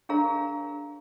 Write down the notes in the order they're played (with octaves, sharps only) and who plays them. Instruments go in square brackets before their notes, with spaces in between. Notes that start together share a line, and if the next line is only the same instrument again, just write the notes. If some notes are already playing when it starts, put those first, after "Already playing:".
[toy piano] D4 G#4 A#4 C#5 F5 A#5